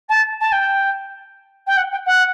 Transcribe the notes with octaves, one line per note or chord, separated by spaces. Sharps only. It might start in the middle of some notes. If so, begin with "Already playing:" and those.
A5
A5
G5
G5
F#5
G5
F#5